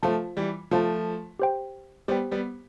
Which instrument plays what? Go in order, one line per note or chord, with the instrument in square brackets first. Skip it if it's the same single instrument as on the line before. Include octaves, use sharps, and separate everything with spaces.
[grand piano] F3 A3 [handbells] F4 C5 F5 A5
[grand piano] E3 G3
[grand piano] F3 A3 [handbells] F4 C5 F5 A5
[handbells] G4 C5 G5
[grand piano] G3 B3 [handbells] G4 C5 G5
[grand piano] G3 B3